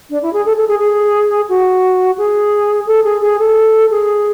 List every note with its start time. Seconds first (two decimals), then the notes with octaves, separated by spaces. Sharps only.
0.10 D4
0.22 E4
0.33 G#4
0.45 A4
0.56 A4
0.68 G#4
0.79 G#4
1.49 F#4
2.18 G#4
2.86 A4
3.04 G#4
3.21 G#4
3.39 A4
3.90 G#4